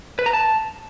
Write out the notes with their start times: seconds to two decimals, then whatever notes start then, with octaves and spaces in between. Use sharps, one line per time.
0.19 B4
0.26 A#5
0.33 A5